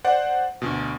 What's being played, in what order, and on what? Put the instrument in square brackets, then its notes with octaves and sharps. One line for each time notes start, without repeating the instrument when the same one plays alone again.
[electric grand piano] C5 D5 F#5
D2 B2